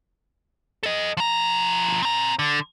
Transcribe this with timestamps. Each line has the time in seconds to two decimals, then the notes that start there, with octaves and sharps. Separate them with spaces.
0.83 A4 D#5
1.17 F3 A#5
2.02 C4 A#5
2.39 D3